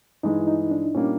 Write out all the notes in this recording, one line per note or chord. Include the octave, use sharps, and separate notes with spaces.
G2 E3 G#3 D#4
E4
D#4
D4
A#2 G3 A#3 C#4 D4